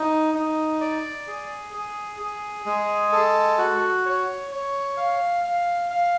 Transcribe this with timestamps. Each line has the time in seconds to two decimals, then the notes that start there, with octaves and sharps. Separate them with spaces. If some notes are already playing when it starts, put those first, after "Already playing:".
Already playing: D#4
0.34 D#4
0.81 D5
1.27 G#4
1.73 G#4
2.20 G#4
2.66 G#3
3.12 A4
3.58 F#4
4.06 C#5
4.51 C#5
4.97 F5
5.44 F5
5.90 F5